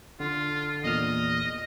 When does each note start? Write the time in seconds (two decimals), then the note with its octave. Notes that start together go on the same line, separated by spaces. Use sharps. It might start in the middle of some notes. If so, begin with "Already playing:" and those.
0.20 D3 F4
0.84 E2 A#2 D#5 F6